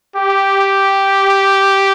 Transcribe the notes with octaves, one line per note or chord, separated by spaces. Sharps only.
G4